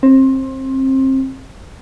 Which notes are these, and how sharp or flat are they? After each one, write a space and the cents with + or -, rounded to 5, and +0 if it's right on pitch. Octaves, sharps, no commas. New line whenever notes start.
C4 +25